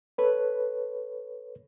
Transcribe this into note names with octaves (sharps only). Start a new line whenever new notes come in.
A4 B4 C#5